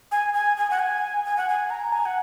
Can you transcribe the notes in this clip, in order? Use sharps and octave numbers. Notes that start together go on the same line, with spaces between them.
G#5
G#5
G#5
F#5
G#5
G#5
F#5
G#5
A#5
G#5
F#5